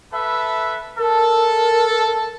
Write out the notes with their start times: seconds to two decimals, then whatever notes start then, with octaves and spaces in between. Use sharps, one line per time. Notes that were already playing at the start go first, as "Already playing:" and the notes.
0.13 A4 B4 E5
0.99 A4 A#4